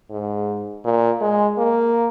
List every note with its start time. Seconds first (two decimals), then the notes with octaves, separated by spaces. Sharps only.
0.11 G#2
0.85 A#2
1.21 G#3
1.58 A#3